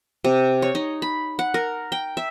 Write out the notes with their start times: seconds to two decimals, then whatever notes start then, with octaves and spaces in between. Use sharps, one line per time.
0.24 C3
0.62 C#5
0.75 D#4
1.02 B5
1.39 F#5
1.54 A#4
1.92 G5
2.17 E5